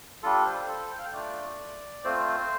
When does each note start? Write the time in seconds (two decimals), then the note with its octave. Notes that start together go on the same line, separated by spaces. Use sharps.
0.23 G3 D4 F4 A4
0.45 C5
0.68 A4
0.91 G5
0.99 F5
1.05 G5
1.13 A3 D4 F4 D5
2.04 A3 C4 F4 C5